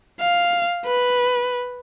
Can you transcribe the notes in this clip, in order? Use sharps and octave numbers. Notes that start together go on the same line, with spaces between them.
F5
B4